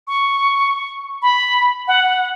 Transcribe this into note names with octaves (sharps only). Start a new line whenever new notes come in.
C#6
B5
F#5